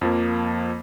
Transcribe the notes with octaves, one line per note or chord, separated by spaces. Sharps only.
F2 F3 A#3